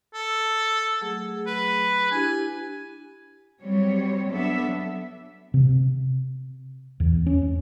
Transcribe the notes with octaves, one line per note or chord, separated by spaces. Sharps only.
A4
F#3 A3 G#4
B4
D4 E4 G4 G#5
F#3 G3 C4 C#5
F#3 B3 D4 A4 E5
C3
E2
C#4